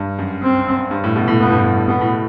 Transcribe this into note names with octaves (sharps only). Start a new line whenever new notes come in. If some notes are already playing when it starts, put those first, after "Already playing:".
Already playing: G2
F#2
C4
G2
A2
B2
A2
G2 B3
A2
G2
G2
G2
B2 B3
A2
B2